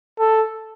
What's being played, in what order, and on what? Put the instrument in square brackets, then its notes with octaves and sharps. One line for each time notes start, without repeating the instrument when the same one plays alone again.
[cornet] A4